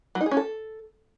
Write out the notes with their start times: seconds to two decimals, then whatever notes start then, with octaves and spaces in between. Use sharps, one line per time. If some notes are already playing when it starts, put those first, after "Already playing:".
0.15 F#3
0.21 D#4
0.26 G#4
0.31 C#4
0.37 A4